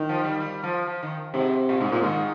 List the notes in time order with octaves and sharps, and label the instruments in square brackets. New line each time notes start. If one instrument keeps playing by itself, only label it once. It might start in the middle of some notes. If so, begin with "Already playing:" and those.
Already playing: [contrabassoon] D#3
[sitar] F3
G3
G3
F3
F3
D#3
[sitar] G#2 [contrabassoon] C3
[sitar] A#2
[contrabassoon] G#2 [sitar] C3
[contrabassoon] A#2
[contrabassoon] G#2 [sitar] D#3